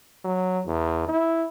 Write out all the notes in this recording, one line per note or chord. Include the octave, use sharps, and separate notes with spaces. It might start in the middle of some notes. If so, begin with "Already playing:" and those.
F#3
E2
E4